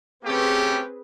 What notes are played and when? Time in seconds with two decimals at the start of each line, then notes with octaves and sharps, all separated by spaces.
0.25 A3 C4 C#4 G4 G#4 B4